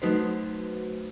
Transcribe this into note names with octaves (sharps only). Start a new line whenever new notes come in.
F#3 A3 D#4 F#4 B4 C5